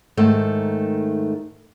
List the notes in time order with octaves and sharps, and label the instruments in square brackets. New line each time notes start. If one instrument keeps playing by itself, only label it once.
[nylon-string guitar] G#2 D#3 A3